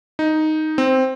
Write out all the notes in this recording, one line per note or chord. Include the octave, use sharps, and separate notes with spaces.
D#4
C4